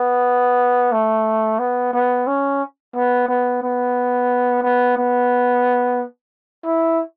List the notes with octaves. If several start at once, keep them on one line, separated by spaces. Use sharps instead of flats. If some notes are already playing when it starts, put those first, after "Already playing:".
Already playing: B3
A3
B3
B3
C#4
B3
B3
B3
B3
B3
E4